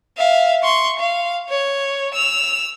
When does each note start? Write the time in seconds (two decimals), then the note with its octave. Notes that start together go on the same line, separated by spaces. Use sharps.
0.17 E5 F5
0.63 C6 C#6
0.99 F5
1.49 C#5
2.14 E6 F7